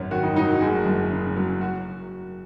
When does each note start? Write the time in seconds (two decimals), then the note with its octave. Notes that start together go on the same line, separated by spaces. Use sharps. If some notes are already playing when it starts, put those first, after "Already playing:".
Already playing: G#1 F#2 C#4
0.11 D#3 F#4
0.23 D#4
0.36 F#3 D#4
0.49 F#4
0.61 F#1 G#4
0.86 F#2
1.12 C#3
1.36 F#3
1.61 F#4